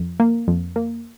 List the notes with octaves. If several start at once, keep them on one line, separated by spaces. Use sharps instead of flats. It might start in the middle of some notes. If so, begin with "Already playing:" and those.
Already playing: F2
A#3
F2
A#3